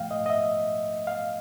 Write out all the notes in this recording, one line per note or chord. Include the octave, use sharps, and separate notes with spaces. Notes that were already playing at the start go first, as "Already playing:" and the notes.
Already playing: G#2 F3 A3 F5 G5
D#5
D#5
E5
F5